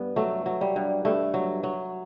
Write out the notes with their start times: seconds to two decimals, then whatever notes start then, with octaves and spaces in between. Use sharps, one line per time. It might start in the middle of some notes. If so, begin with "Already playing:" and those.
Already playing: G2 B3
0.16 F#3 A3
0.46 F#3
0.61 G3
0.76 G2
1.05 G2 A3
1.34 F#3
1.63 F#3